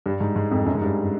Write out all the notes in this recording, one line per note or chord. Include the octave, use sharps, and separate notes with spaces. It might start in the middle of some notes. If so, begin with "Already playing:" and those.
G2
G#2
G#2
F2
F#2
G#2
G2